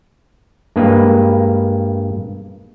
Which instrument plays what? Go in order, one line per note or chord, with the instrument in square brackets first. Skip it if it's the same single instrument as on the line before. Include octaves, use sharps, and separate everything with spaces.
[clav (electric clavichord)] G2 G#3 A#3 B4